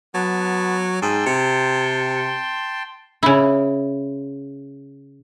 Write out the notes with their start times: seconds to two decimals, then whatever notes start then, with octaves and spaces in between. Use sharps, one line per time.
0.14 F#3 B3 A5
1.02 G#2 G5 A5 C6
1.26 C3
3.23 C#3 E4